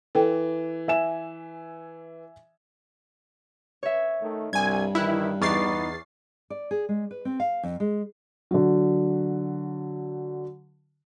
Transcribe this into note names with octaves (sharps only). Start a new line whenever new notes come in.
E3 A4 G5
E5 G#5 E7
C#5 E5
D#3 A3
C2 G2 G#5 G#6
D#3 E3 E4 F6 F#6
E2 B3 D#4 C#6 D6 F6 A6 C7
D5
G#4
G#3
B4
C4
F5
F2
G#3
D3 F#3